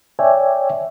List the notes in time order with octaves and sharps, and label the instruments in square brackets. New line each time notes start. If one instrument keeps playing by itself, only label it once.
[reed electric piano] C#5 D5 E5 G5 G#5